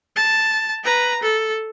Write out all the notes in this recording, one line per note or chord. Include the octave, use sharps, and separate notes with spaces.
A5
B4 A#5
A4